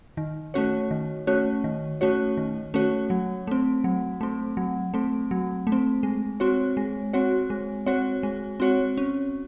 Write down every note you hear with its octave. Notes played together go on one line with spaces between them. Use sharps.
D#3
A3 C#4 F#4 C#5
D#3
A3 C#4 F#4 C#5
D#3
A3 C#4 F#4 C#5
D#3
A3 C#4 F#4 C#5
F#3
A3 C4
F#3
A3 C4
F#3
A3 C4
F#3
A3
C4
G#3
C4 F#4 C#5
G#3
C4 F#4 C#5
G#3
C4 F#4 C#5
G#3
C4 F#4 C#5
C#4